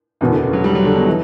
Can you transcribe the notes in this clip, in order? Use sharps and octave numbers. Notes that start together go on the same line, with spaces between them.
F#1 E2 B2 E3
D3
C#3
F#3
G3
F#3
D3
B2
E3